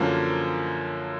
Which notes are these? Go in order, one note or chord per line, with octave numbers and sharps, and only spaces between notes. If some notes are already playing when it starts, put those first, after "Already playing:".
Already playing: F#2 D3 F3 A#3